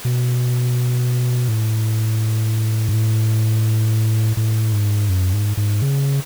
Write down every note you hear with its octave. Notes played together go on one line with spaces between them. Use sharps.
B2
A2
G#2
A2
A2
G#2
F#2
G#2
G#2
C#3